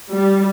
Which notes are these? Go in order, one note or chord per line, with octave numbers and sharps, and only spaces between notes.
G3